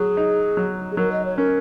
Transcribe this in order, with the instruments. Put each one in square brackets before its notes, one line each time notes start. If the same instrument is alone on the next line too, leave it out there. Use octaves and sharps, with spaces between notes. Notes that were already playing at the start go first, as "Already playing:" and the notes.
Already playing: [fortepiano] F#3 [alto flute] G#4
[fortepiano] D#4
F#3
[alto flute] G#4
[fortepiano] F#3 [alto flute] A#4
[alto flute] D#5
C#5
[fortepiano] C#4 [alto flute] A#4